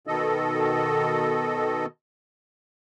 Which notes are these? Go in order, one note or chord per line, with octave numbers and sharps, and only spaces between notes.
B2 D#3 A4 D#5